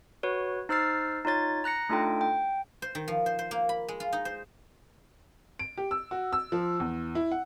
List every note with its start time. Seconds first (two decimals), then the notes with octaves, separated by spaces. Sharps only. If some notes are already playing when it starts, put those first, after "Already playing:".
0.23 F#4 B4 C#5
0.69 D#4 C5 E6 F6 A6 C7
1.25 D#4 F4 C#5 A6
1.64 A#5 F#6 A#6 C#7
1.89 A3 D4 D#4 F4 A4 G5
2.21 G5
2.82 C5
2.95 D#3
3.08 F3
3.26 C5
3.39 C5
3.51 A#3
3.69 B5
3.88 G#3
4.00 F4
4.13 D#4
4.25 C5
5.59 D7
5.78 G4
5.91 E6
6.11 F#4
6.33 E6
6.52 F3
6.80 E2
7.15 E4
7.31 F#5